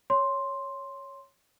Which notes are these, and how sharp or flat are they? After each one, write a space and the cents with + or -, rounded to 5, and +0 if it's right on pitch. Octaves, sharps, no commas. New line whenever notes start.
C#5 +0 C6 +5